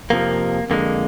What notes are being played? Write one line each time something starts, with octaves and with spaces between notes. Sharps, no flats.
F2 C3 F3 A#3
F2 D3 G#3 A#3